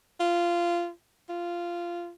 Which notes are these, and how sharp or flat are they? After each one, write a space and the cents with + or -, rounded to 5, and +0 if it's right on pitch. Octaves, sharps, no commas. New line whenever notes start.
F4 -15
F4 -10